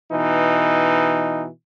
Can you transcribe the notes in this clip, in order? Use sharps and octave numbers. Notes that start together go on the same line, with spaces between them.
B2 E3 D#4